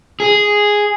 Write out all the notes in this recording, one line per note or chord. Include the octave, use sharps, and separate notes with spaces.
G#4